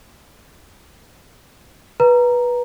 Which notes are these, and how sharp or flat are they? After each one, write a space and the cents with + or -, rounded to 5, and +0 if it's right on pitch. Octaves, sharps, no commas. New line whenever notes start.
B4 -15 A#5 +0